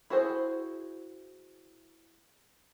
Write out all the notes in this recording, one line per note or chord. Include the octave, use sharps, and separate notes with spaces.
E4 F#4 G#4 C5